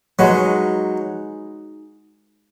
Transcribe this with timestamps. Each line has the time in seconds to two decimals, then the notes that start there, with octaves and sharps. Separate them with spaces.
0.19 F#3 G#3 D#4 F#4 B4